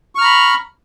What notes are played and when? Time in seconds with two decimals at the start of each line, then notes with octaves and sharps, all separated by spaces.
0.15 C#6
0.18 F6
0.21 A#5
0.24 B5